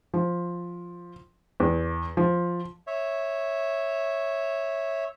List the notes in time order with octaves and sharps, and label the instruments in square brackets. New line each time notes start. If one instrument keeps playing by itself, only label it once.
[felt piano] F3
E2
F3
[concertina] C#5 E5